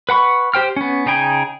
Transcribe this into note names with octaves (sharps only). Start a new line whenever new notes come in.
B4 F#5 B5 C#6
G4 C5 G5 F6
B3 C#4
C#3 D#4 G#4 G5 G#5